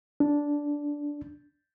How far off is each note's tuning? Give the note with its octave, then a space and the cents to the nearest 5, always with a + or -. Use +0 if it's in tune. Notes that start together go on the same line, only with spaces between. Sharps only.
D4 -10